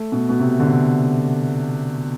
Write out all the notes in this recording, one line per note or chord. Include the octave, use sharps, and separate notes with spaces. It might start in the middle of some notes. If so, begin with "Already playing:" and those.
Already playing: A3
B2
B2
C3
D3
C3